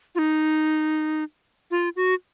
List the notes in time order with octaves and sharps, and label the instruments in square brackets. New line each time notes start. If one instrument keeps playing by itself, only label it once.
[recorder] F4
D#4
F4
F#4